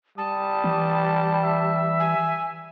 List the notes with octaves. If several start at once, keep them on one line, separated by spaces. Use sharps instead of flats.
G3 A5 D#6
E3
E5
G#5